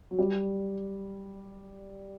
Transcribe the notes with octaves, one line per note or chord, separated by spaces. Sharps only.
F#3
G3